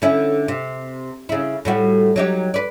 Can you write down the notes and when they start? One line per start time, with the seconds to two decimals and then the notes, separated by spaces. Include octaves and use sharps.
0.02 D3 C#4 E4
0.48 C3
1.29 C#3 E4
1.65 A2 G3 F#4
2.16 F#3 D#4 G4
2.54 B4 D5